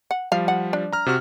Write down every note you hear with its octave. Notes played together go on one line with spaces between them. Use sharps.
F#5
F3 G3 F5
F#5
D4
A#5 F6
C3 F#4 F6